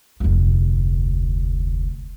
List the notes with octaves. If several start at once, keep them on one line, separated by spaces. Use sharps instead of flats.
F1 D2